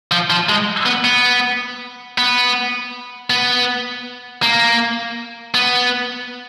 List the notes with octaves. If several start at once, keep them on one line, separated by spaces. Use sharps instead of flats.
F3
F3
G#3
B3
B3
B3
B3
A#3
B3